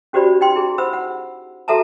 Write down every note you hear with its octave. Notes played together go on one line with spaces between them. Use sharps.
C#4 F#4 G4 C5 D5 B5
D#4 G5 C6
E4 G#4
C5 F#5 B5 E6
F#5
F#4 A4 E5 A5 A#5